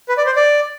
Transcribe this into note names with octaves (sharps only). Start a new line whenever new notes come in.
B4
D5
C5
D5